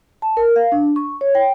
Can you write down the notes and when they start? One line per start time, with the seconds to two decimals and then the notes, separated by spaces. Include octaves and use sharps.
0.22 A5
0.37 A#4
0.56 F5
0.72 D4
0.96 C#6
1.21 C#5
1.35 G5